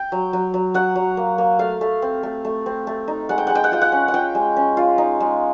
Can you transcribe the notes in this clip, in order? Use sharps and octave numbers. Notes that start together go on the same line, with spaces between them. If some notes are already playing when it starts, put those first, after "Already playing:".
Already playing: G5
F#3
F#3
F#3
F#3 F#5
F#3
A#3
A#3
A3 F5
A3
C4
A3
A3
C4
A3
D#4
G#3 F#5
G5
G#3 F#5
G5
F#5
F4 G5
F#5
C#4
F#5
F4 G5
G#3
C#4
F4
D#4
G#3